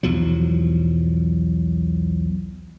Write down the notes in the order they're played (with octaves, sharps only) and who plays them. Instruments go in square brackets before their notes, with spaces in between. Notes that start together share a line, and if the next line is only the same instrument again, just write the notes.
[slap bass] B1 E2 F3 F#3